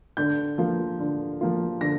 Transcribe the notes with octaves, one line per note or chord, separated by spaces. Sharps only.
D3 G6
F3 A#3 F4
D3
F3 A#3 F4
D3 A#6